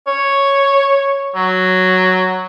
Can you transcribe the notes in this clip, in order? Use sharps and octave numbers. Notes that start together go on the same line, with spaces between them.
C#5
F#3